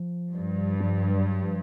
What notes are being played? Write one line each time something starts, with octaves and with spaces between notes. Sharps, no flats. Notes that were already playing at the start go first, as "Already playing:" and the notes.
Already playing: F3
G2
F3
F#3
F3